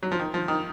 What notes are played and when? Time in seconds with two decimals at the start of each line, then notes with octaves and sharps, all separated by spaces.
0.03 F#3
0.12 F3
0.19 D#3
0.34 F3
0.48 D#3